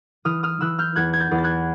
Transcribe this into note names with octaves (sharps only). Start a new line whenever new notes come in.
E3 D#6 F6
D#6 F6
E3 E6 F#6
F6 G6
E2 F#6 G#6
G#6
G6 A6
E2
A6
F#6 G#6